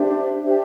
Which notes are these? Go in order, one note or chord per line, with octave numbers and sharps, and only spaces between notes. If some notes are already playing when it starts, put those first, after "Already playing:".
Already playing: D4 G4 C5 E5
D4 G4 C5 E5